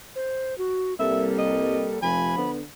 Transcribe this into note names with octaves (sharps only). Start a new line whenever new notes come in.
C5
F#4
C2 G3 A#3 A4 E5
D#5
F1 F3 G#5 B5
D3 B3